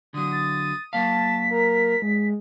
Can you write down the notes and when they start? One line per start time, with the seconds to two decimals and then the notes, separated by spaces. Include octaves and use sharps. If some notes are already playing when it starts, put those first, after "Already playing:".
0.14 D3 F#3 D#6
0.32 A6
0.93 F#3 A#3 F5 A5 B6
1.51 A#4
2.02 G#3